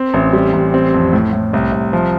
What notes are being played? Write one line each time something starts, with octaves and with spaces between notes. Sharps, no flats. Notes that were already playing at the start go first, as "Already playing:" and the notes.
Already playing: C4
A1
G3
A1
C4
F2
A2
A2
C2
C2
F3